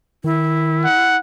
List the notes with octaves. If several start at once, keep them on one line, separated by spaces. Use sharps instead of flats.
D#3 E4
F#5